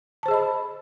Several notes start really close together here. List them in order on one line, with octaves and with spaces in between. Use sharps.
A5 C5 G#4 D#5 B5